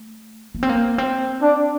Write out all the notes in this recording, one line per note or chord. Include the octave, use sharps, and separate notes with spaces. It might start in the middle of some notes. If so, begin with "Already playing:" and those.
Already playing: A3
A#3
C4
A#3
C4
D4